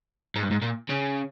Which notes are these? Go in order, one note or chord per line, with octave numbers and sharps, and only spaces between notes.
G#2
G2
G#2
A#2
C#3